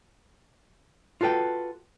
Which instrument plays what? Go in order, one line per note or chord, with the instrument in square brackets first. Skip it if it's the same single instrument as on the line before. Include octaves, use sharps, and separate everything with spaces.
[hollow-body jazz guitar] F4 F#4 A4 B4 G5